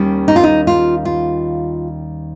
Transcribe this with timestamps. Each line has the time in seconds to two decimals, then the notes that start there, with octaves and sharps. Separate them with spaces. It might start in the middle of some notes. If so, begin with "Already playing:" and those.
Already playing: D#2 D#3 G3 C#4
0.28 D#4
0.36 F4
0.43 D#4
0.67 F4
1.05 F4